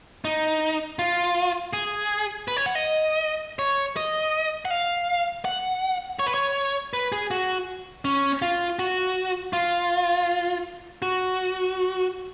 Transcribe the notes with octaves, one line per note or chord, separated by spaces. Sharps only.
D#4
F4
G#4
B4
C#5
F#5
D#5
C#5
D#5
F#5
F5
F#5
C#5
B4
C#5
B4
G#4
F#4
C#4
F4
F#4
F4
F#4